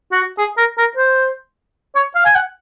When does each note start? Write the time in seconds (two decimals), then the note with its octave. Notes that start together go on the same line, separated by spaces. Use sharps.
0.12 F#4
0.38 G#4
0.58 A#4
0.78 A#4
0.97 C5
1.95 C#5
2.15 F5
2.25 G#5
2.35 F#5